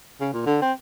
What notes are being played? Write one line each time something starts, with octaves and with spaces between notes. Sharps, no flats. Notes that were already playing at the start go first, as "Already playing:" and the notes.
C#3
A#2
D3
C4